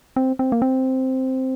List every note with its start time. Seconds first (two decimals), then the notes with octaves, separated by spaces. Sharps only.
0.16 C4
0.39 C4
0.52 A#3
0.62 C4